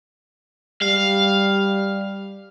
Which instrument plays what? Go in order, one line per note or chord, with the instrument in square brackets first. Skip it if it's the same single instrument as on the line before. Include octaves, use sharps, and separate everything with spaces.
[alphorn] G3 [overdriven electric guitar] F5